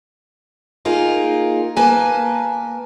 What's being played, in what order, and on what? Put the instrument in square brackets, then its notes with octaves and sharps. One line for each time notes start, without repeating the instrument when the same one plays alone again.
[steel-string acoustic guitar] A#3 D#4 F4 G#4 A#4
A#3 B4 G#5 A5